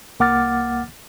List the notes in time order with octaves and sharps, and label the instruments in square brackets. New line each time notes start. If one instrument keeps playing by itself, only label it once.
[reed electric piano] C2 A#3 F#5 D6 F6 A6